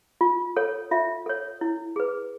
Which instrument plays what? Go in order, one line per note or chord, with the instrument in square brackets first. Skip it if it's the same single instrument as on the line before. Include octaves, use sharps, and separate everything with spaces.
[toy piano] F4
A4 C#5
F4 E5
A4 C#5
E4
G#4 B4